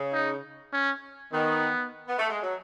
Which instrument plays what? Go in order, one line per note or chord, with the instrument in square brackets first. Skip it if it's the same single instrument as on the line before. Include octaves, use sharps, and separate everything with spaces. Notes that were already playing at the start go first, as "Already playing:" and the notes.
Already playing: [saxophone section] C#3
[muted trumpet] D#4
C#4
[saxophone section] D#3 [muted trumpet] B3
[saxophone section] B3
A3
G#3
F#3